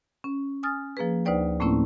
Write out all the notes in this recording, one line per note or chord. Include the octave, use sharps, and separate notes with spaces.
C#4
G#5 D#6 F6 A6
F3 A#3 G#4 B4
D2 D#4 B4 C5 D5 G5
A2 A3 A#3 C4 C#4 E4